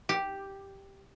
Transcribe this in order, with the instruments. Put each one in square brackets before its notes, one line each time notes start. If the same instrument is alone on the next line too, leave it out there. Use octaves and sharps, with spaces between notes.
[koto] G4